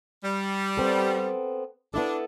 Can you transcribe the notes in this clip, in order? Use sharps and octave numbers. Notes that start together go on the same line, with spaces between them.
G3
B3 C4 A4
B3 D4 E4 A4